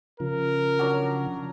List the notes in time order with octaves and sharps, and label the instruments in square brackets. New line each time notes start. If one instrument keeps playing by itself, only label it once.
[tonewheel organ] C#3 F3 [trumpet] A#4
[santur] F#3 D4 A#5